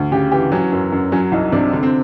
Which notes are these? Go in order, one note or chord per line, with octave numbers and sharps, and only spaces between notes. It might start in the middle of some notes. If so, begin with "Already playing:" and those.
Already playing: D2
C#3 G4
E3 G4
F#3 C#4
F#2
F#2
F#3 C#4
C2 D#4
C3 D4
D3
C4